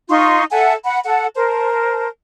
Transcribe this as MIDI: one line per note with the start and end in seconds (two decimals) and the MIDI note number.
0.09 0.44 63
0.09 0.44 65
0.09 0.44 84
0.09 0.44 85
0.51 0.73 69
0.51 0.73 76
0.51 0.73 78
0.51 0.73 80
0.84 0.99 78
0.84 0.99 83
1.05 1.25 69
1.05 1.25 78
1.35 2.07 70
1.35 2.07 72
1.35 2.07 81